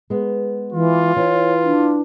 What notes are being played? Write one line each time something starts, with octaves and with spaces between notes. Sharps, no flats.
G#3 B3
E3 F4
E3 C#5
D4